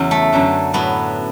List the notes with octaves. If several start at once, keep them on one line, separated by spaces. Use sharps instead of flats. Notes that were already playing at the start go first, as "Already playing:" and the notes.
Already playing: E2 C#3 F#3
A3
F#2 D3 F#3
A2 F#3 B3